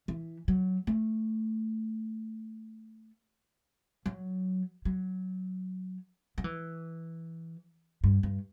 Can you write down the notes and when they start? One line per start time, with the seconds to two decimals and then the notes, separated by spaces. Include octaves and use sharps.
0.08 E3
0.48 F#3
0.87 A3
4.06 F#3
4.85 F#3
6.38 F#3
6.44 E3
8.04 G2
8.23 G2